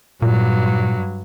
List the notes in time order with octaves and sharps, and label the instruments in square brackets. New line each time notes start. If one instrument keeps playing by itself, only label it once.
[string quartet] G2 F#3 [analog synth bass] A#2